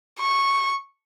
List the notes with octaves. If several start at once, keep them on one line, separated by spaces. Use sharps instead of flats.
C#6